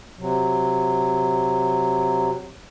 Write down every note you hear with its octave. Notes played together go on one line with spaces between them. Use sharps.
C3 F#3